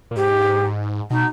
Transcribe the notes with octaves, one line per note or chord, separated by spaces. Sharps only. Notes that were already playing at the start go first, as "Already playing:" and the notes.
A#2
G#2 G4
B2 D#4